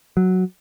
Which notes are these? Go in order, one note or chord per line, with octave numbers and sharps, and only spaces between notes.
F#3